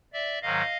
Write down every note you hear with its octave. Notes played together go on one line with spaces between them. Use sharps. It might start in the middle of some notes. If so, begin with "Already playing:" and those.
D5 E5
G#2 D#3 F#3 D#5 F5